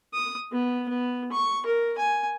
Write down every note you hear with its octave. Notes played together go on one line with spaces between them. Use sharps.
D#6
B3
B3
C#6
A#4
G#5